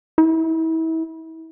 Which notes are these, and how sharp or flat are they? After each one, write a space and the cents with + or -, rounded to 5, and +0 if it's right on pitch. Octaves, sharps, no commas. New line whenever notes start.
E4 -35